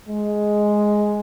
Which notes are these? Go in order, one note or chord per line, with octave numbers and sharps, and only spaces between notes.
G#3